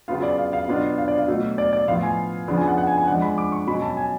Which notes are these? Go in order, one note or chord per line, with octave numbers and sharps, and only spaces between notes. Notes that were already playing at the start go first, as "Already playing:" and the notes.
C#3 F#3 B3 F4 F5
D5
F5
F5
B2 F#3 B3 D4 F4
F5
D5
F5
B2 F#3 A3
D5
D5
A2 F3 B3 F4 F5
G#5
C#3 F3 B3 D4 F4
G#5
F#5
F#5
G#5
G#5
F3 G#3 D4 F#5
B5
D6
C#6
B2 F#3 C#4 B5
A5
G#5